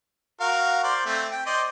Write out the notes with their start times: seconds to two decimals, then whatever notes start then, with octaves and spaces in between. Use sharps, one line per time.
0.40 F#4 A#4 F5
0.84 C5 D5
1.06 A3 C4
1.31 G5
1.46 C5 D5 D#5